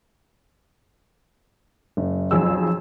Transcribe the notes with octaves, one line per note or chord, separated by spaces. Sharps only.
F#1
B1 F2 G#4 E6